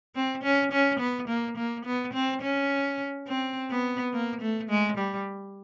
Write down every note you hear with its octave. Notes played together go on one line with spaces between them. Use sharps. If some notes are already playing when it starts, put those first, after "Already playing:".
C4
C#4
C#4
B3
A#3
A#3
B3
C4
C#4
C4
B3
A#3
A3
G#3
G3